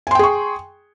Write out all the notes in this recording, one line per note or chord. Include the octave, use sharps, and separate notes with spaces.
G#4 G5 G#5 C6 C#6